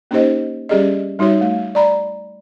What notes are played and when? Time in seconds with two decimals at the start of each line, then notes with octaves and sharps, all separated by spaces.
0.11 A#3 C#4 D#4 G4 C5 D#5
0.69 G3 C#4 G4 G#4 D5 D#5
1.19 G3 D#4 F#4 C#5 E5
1.41 A3
1.75 D5 A#5 B5